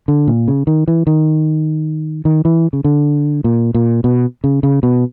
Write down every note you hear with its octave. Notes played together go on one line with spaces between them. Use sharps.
D3
A#2
C#3
D#3
E3
D#3
D#3
E3
C#3
D3
A#2
A#2
B2
C#3
C#3
B2